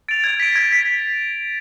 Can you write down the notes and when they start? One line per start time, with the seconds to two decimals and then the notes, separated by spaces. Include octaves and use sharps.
0.08 A6 D7 F7
0.24 G#6
0.40 B6 D7
0.55 G#6
0.72 B6 D7